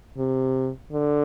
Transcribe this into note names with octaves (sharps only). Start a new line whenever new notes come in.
C3
D3